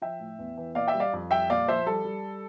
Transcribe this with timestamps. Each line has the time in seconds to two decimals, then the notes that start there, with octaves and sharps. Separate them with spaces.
0.02 F3 E5 G5
0.20 A2
0.39 E2
0.57 E3
0.75 A#2 D5 F5
0.88 E5 G5
0.94 G3
1.00 D5 F5
1.13 F2
1.31 G3 E5 G5
1.50 A#2 D5 F5
1.68 F3 C5 E5
1.86 G3 A4
2.05 G3